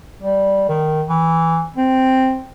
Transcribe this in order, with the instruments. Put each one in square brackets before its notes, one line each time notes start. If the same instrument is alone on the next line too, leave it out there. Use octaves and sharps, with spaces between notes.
[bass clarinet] G3
D#3
E3
C4